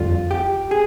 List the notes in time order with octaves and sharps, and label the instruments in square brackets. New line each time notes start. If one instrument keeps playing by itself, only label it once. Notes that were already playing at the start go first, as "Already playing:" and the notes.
Already playing: [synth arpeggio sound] F2 D3 G3 [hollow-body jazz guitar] F4
[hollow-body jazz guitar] G4
G#4